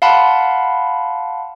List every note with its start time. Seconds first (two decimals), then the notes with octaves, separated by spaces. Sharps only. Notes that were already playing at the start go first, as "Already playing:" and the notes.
0.02 F5 F#5 A5 B5 C6